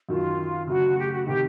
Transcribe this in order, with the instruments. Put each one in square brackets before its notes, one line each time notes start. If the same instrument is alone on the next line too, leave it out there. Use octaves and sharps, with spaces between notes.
[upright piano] F#2 D#3 F#3 [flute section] F4
[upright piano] C#3 F#3 A3 [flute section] F#4
[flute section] G4
F#4
[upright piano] C3 D#3 [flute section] G4